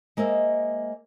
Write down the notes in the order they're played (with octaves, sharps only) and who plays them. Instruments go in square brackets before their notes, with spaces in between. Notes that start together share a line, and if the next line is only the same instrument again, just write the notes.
[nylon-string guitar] G#3 A#3 C5 D#5 E5